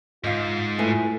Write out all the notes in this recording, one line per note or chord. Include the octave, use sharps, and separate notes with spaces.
G#2 F4 D#5 F5
A3 E4 B4 C5 G#5